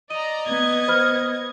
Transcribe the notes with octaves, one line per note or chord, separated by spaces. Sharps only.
D5 D#5 A#5 D#7
B3 G#6
C5 B5 F6